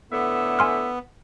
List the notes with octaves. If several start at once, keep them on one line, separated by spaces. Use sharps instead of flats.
A2 D3 B3 E5
G#5 C6 F6